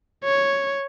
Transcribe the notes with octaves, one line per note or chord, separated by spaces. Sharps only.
C#5